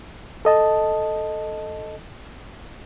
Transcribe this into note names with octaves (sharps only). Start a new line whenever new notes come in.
A4 D#5 A5